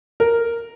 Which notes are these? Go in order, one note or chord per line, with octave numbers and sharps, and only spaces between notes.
A#4